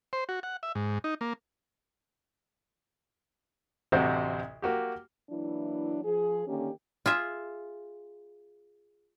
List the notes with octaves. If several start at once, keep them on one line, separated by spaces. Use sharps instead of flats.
C5
F#4
F#5
E5
G#2
D#4
A#3
A1 D2 C3 F#4 C5
A#3 F#4 G4
E3 F#3 A#3 D4 E4
F3 G#4
D3 D#3 A#3 C#4 G4
F4 G#4 E5